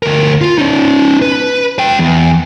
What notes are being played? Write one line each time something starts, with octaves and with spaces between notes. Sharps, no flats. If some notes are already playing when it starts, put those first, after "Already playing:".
D2 A#4
F4
C#4 D#4
B4
B4 G5
E2